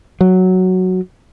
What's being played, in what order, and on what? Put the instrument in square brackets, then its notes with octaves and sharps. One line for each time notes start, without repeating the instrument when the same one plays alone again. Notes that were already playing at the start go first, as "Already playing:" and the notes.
[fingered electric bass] F#3